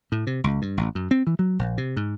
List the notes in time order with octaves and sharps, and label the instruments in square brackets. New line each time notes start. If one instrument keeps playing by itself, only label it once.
[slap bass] A2
C3
C#2
G2
A1
F#2
C4
E3
F#3
A#1
C3
G#2